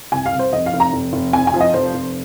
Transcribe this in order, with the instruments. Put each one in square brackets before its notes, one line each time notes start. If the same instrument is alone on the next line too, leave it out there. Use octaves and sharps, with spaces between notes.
[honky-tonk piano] C2 G#5
F5
C2
C5
F1 D#5
F5
F1
A#5
F1
F1
F2 G#5
G#5
F3
D#5
F1 C5
F1